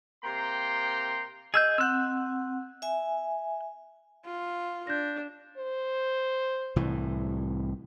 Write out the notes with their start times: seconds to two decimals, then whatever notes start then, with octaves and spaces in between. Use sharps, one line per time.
0.24 C3 A#3 G5 A#5 C6
1.54 G#4 D#5 E6 G6
1.78 C4 F#5 E6 F#6 G6
2.82 E5 G#5
4.26 F4
4.87 D4 G6 A#6
5.58 C5
6.76 C2 A2 E3